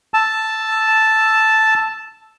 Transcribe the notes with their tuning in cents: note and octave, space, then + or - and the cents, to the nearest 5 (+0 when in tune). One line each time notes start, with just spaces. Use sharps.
A5 +0 E6 +0